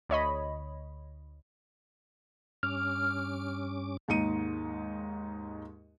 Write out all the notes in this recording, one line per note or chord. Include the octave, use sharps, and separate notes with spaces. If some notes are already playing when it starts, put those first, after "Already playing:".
D2 C#5 D#5 B5
G2 C#4 D6 F6
D#2 G#2 D#4 C#7 D#7